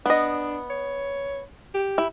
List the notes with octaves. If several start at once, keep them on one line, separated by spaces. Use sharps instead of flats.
B3 D4 D#5
C#5
G4
E4